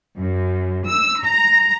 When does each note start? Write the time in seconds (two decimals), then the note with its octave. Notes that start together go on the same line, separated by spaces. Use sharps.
0.19 F#2
0.86 E6
1.22 A#5